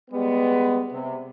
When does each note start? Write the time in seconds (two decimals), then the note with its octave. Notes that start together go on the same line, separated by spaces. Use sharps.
0.10 G3 G#3 B3
0.90 C3